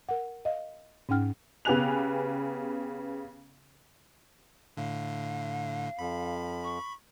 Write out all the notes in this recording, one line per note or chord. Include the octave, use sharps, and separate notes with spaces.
A#4 F#5
D#5 F5
G#2 C#4 D#4 F#5 G5 F6
C#3 B3 G4 G#5 F#6 F7
A2 D3 F5
F2 B5
C#6